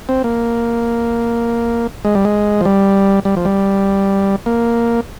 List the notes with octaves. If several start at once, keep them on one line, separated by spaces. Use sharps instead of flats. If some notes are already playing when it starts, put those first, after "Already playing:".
C4
A#3
G#3
G3
G#3
F3
G3
G3
F3
G3
A#3